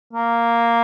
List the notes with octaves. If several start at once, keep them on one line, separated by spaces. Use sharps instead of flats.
A#3